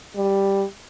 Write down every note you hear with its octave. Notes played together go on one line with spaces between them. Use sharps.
G3